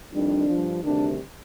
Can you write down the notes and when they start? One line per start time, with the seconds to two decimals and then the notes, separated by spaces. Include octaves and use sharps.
0.13 F2 D#3 G3 D4
0.48 G2 F3
0.83 D2 C3 D#3 G3 D4